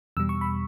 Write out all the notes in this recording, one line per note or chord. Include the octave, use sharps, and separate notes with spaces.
E2 B2 G3 E6
C#6
B5